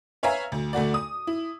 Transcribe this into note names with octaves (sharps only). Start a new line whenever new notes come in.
B4 C#5 E5 F5 G#5 A#5
D2
D2 A3 F#4 D5
D#6
E4